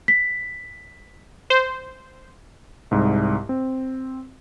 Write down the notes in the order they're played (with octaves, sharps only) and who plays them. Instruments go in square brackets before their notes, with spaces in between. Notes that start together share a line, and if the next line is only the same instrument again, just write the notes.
[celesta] B6
[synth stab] C5
[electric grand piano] C2 G#2
C4